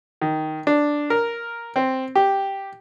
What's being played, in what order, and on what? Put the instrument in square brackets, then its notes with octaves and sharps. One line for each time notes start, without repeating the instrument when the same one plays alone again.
[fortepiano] D#3
D4
A#4
C4
G4